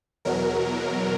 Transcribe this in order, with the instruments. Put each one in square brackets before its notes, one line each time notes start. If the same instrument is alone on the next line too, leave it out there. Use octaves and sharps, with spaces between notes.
[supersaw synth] E2 B2 F#3 A#4